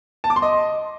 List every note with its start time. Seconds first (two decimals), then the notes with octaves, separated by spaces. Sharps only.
0.24 A5
0.30 D6
0.36 C6
0.42 D#5